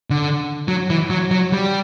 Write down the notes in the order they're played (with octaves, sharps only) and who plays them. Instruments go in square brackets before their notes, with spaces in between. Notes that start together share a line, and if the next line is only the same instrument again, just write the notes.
[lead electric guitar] D3
F#3
E3
F#3
F#3
G3